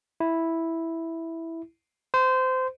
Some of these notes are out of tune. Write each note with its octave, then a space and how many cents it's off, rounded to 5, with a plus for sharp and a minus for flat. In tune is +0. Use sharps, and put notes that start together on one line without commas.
E4 -5
C5 -20